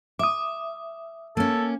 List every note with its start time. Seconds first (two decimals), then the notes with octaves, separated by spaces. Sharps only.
0.19 E5 D6 D#6
1.37 A#3 C#4 A4